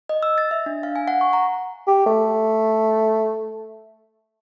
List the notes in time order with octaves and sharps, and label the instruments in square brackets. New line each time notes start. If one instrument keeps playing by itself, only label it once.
[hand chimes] D#5
E6
A6
E5
D4
F5
G#5
F#5
C#6
A#5
[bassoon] G4
A3